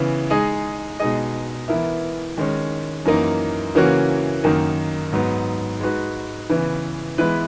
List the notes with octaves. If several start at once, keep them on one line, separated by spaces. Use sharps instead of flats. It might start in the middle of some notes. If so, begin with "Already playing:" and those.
Already playing: C#3 E3 B3
G#3 D#4 G#4 D#5
B2 G#3 D#4 G#4 D#5
E3 B3 E4 A#4 E5
D#3 G#3 C#4
F#2 E3 A#3 D#4
C#3 E3 A#3 C#4 F#4
F#2 D#3 A#3 D#4
G#2 F#3 B3
G#3 D#4 F#4 B4
C#3 E3 B3 E4 B4
E3 G#3 B3 E4 B4